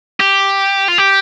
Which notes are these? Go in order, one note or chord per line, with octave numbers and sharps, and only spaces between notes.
G4
F4
G4